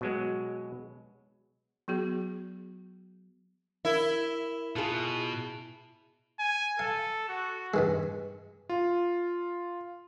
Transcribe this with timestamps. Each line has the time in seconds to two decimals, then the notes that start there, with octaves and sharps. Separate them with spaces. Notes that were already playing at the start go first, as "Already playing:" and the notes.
0.01 B2 F#3 G#3
1.88 F#3 B3 F#4 G#4
3.85 E4 A#4 G7
4.76 B2 F4 G#4 A5
6.39 G#5
6.79 A4 F5
7.29 F#4
7.74 G2 D#3 G#3
8.69 F4